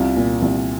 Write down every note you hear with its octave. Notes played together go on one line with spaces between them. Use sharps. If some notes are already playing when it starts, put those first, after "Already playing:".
Already playing: C2 F4
A#2
C2